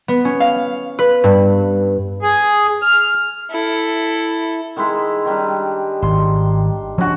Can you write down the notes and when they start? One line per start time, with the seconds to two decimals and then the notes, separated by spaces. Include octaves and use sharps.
0.08 B3
0.25 C#4
0.40 F5
0.99 B4
1.24 G2
2.22 G#4
2.82 F6
3.51 E4 A4
4.76 D#3 G#3 E4
5.25 D#3 G3 D4
6.02 G#1 C6
6.98 F3 C#4 D4 F#4